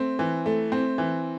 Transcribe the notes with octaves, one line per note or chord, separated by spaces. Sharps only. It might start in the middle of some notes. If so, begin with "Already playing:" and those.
Already playing: A3 C4
E3
A3
C4
E3